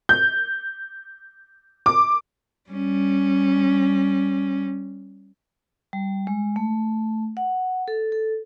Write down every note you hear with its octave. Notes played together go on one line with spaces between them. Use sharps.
G6
D6
G3 C#4
G3
G#3
A3
F#5
A4
A4